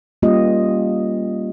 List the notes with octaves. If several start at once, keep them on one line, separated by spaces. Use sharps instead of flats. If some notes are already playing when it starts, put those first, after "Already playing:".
G3 A#3 C#4 F4 G4 D#5